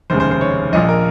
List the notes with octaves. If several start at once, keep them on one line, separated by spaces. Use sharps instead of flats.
F1 D#2 C#3 G#3 C5
C5
C5
C#5
A#1 A#2 F3 D#5
A#4